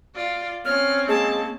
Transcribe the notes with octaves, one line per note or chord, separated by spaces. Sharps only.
F4 D5
C4 C#4 C#5 F6
G#3 A#3 A5